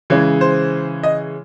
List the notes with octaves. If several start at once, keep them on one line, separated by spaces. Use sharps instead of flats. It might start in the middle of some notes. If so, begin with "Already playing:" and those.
C#3 E3 G#3 C#4
C5
D#5